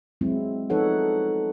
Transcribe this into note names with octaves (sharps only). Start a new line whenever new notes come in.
F#3 G#3 C4 E4
F3 D#4 A4 B4 C#5 F#5